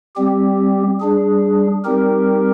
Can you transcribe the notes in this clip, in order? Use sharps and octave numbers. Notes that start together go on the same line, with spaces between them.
G3 C4 G4
G3 D4 G#4
G3 C4 D#4 G4 A#4